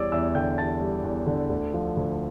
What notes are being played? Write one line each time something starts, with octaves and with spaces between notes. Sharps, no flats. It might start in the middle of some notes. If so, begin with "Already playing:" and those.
Already playing: E2 G3 C#5 D5 D6 E6
E2 E5 E6
D3 G5 G6
E2 A5 A6
G3
E2
D3
D2
F3
D2